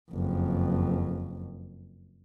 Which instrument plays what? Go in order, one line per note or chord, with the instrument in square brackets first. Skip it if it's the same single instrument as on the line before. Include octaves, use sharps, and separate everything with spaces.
[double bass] F#1 F2